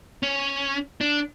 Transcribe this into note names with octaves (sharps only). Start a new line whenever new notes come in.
C#4
D4